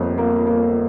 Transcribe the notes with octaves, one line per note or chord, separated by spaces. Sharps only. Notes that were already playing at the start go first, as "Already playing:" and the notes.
Already playing: G1 F2 A#3
A#3
A#3